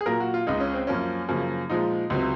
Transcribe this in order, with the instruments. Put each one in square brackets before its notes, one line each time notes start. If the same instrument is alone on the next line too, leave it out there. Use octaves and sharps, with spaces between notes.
[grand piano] G#4
A#2 F#3 A#3 A#4
F#4
F4
C#2 C#3 G#3 D#4
C#4
C4
F#2 F3 A#3 C#4
F#2 C#3 F3 A#3
A#2 F3 G#3 D#4
C#2 C3 F#3